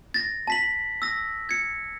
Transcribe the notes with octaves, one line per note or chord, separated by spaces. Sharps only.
A6 A#6
A5 B6 F#7
E6 A#6
G#6 C#7